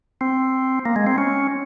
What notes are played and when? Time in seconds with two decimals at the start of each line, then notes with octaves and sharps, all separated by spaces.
0.21 C4
0.85 A#3
0.96 G#3
1.07 C4
1.18 C#4